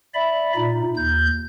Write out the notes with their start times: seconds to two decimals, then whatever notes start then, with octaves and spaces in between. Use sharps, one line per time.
0.14 D5 E5 B5
0.56 A#2 D#4
0.97 D#2 G6